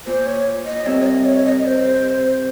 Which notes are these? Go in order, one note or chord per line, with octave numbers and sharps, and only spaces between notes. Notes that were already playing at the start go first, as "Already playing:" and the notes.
A#2 C5
C#5
D#5
C2 C3 C#5
C#5
D#5
C#5
D#5
C5